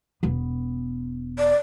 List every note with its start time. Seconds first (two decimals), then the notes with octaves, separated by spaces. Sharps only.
0.23 E1 B3
1.38 D5